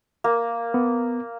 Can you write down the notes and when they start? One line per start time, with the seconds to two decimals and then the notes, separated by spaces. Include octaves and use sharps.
0.24 A#3
0.74 B3